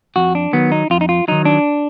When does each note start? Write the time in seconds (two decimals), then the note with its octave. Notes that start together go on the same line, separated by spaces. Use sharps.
0.16 F2 F#4
0.35 D4
0.53 D#3 F#3 B3
0.72 D#4
0.90 F2 F4
1.01 D#4
1.09 F4
1.28 D#3 F#3 D#4
1.45 D4